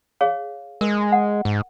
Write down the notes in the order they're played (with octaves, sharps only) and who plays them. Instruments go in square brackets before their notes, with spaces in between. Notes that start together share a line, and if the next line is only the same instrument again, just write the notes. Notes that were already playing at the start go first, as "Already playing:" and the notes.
[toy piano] G#4 C#5 F5
[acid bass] G#3 [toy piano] A#4
[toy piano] F#5
[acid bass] G#2